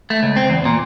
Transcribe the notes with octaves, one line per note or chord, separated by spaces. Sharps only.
A3
C#2
C4
E2
A#2